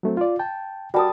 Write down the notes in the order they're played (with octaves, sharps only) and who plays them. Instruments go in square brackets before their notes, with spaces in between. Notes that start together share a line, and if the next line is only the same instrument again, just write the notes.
[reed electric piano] F#3 A3 C4
F4 D5
G5 A5
[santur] G3 A5 D#6 [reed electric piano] F#4 A#4